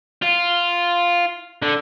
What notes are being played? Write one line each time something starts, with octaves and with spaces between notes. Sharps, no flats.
F4
D3